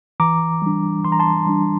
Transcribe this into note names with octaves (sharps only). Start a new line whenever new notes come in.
E3 A#5 D6
G3 D4
E3 C6
A#5
A5 C6
G3 D4